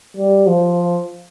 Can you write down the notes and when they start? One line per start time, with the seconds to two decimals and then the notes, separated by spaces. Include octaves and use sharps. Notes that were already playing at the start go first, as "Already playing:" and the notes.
0.17 G3
0.47 F3